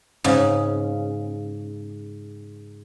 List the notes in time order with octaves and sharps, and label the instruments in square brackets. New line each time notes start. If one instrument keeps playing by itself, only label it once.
[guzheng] G#2 C#3